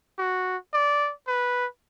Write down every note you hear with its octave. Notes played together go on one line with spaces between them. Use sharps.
F#4
D5
B4